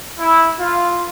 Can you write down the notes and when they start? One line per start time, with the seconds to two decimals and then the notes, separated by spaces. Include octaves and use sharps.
0.18 E4
0.58 F4